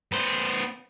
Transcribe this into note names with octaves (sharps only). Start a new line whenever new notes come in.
B3 C5